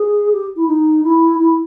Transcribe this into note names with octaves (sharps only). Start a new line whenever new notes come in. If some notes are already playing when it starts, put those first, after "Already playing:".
Already playing: G#4
G4
E4
D#4
E4
E4